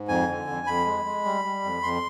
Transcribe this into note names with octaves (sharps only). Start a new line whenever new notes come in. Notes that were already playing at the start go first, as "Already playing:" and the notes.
Already playing: G#2
F2 G#5
D3
F2
F2 B5
G#3
G#3
G3
G3
F2
F2 C6